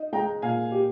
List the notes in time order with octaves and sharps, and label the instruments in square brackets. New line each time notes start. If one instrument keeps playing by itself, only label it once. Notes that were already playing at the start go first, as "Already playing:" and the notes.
Already playing: [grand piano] D#4
[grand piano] G#3 [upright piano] G5 A#5
[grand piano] A#2 [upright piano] F5 G#5
[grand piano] G4